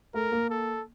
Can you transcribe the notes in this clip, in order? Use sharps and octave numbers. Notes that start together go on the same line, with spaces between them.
A3 A#4
A#3
A4